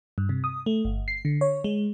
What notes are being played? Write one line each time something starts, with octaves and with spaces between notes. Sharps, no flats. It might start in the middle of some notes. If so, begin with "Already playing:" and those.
G2
C3
D#6
A3
G1
C7
D3
C#5
G#3